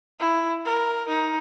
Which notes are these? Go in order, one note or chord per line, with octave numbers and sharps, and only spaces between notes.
E4
A#4
D#4